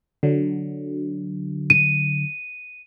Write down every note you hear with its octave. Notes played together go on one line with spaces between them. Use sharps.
D3 F#3
D#7